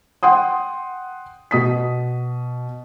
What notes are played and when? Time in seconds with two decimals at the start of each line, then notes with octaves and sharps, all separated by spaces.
0.23 F#5 G5 C6 D#6
1.51 B2 D#6 B6